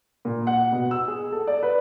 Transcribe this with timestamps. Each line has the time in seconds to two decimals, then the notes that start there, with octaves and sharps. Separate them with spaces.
0.25 A#2
0.47 F#5
0.72 B2
0.91 E6
1.08 G#4
1.32 A4
1.47 D5
1.63 B4